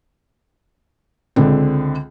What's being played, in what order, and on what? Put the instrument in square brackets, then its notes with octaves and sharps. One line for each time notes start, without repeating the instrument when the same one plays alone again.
[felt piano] C#2 D3 C4